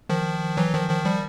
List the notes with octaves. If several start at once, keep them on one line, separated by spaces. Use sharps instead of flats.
D#3 F3
E3 F#3
D#3 F3
D#3 F3
F3 G3